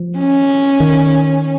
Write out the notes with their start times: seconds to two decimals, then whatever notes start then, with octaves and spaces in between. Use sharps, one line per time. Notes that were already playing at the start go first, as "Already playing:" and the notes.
Already playing: F3
0.18 C#4
0.80 D#3